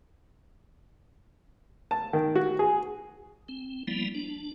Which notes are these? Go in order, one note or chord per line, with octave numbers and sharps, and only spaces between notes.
A5
D#3
F#4
G#4
C4
F3 G3 A#3 B3 E4
D4